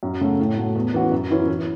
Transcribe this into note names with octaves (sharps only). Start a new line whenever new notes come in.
F#2
C#3 A3 F#4
A2
A3 F#4
E2
E3 C#4 F#4
F#2
E3 C#4 E4
E3